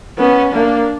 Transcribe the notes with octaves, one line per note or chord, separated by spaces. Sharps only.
B3 C#4
A#3 D4